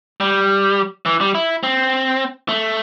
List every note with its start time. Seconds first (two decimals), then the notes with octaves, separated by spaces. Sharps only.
0.20 G3
1.06 E3
1.21 G3
1.35 E4
1.63 C4
2.49 A3